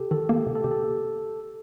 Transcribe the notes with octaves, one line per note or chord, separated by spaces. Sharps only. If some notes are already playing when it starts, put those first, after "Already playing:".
Already playing: C3 G4 A4
D#3 A4
A#3 G4
C3
A4
C3 G4
A4